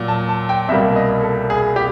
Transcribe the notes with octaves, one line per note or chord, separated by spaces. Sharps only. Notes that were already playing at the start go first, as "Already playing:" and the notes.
Already playing: A#2 F#3
A5
A5
G5
C2 B2 G3 A#3 E5
D#5
A4
G#4
G4